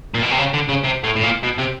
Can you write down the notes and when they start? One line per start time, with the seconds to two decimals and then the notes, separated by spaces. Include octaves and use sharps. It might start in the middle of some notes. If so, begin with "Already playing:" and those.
0.14 A#2
0.22 B2
0.31 C3
0.38 C#3
0.53 D3
0.68 C#3
0.84 C3
1.04 A2
1.16 A2
1.23 A#2
1.43 B2
1.58 C3